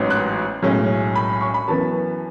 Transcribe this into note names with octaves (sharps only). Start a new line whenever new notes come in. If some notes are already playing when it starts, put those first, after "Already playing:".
Already playing: A1 G#2 F#3 B3
F#6
B1 A2 G#3 C#4
B5
C#6
B5
F#2 E3 B3 A5